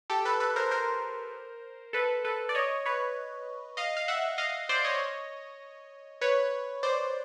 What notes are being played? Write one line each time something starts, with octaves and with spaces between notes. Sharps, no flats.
G4 A4
A4 B4
A4 B4
A#4 C5
A#4 C5
A4 B4
A4 B4
D5
C#5 D#5
B4 C#5
D#5 F5
F5
E5 F#5
D#5 F5
C5 D5
C#5 D#5
B4 C#5
C5 D5